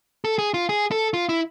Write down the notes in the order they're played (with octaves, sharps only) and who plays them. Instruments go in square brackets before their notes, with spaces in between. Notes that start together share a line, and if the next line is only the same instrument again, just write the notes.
[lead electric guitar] A4
G#4
F4
G#4
A4
F4
E4